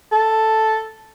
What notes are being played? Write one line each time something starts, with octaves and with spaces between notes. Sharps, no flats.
A4